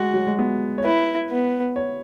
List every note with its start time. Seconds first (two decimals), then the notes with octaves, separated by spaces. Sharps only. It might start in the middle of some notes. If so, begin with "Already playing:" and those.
Already playing: G#3 F#4
0.14 F#3
0.27 G#3
0.39 B3
0.78 C#5
0.85 E4 B4
1.30 B3
1.76 C#5